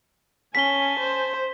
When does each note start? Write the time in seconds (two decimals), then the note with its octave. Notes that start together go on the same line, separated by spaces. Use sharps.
0.55 C#4 G#5 A5 B6 G7
1.00 C5